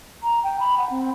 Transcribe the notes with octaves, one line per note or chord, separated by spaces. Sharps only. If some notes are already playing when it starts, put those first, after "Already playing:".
A#5
G5
B5
F#5
C4